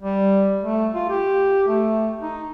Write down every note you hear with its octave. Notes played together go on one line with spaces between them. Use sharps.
G3
A3
F4
G4
A3
D#4